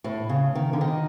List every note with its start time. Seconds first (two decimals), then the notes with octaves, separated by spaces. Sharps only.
0.04 A2
0.29 C#3
0.55 D#3
0.73 D3
0.81 D#3